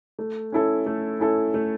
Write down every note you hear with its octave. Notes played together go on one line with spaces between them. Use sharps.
A3
C#4 E4 A4
A3
C#4 E4 A4
A3